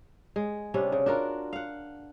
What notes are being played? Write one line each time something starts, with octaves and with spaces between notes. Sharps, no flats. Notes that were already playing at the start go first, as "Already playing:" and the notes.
G#3
C3 G3 C#4 D4
C#3
D4 F4 F#4 A#4
F5 F#5